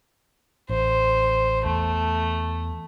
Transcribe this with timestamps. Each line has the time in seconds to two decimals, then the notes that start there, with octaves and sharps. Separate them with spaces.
0.69 A1 C5
1.65 E2 A3